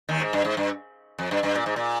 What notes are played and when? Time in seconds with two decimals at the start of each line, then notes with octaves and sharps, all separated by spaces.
0.09 D#2 D#3
0.20 G#2
0.33 G2
0.45 G#2
0.57 G2
1.19 F2
1.31 G2
1.43 G2
1.55 A#2
1.66 G#2
1.76 A#2